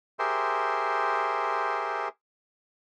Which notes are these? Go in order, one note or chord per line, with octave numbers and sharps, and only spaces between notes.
G4 G#4 A#4 C5 E5 C6